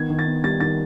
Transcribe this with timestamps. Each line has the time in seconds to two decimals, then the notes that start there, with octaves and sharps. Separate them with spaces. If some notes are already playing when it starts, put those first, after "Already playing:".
Already playing: D#3 B3 G#6
0.10 D#3
0.19 A6
0.27 B3
0.44 G3 A6
0.60 D#3 A6